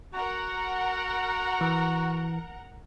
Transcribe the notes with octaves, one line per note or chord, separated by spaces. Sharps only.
F#4 A#4 F#5 A#5
E3